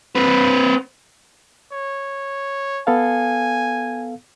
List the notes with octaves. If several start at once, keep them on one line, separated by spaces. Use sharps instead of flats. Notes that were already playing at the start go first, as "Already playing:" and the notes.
C4 B4
C#5
B3 A4 F5 G#5